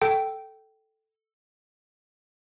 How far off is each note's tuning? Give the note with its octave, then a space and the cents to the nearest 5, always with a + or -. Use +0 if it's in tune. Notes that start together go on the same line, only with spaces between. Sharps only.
A4 +0 G5 -15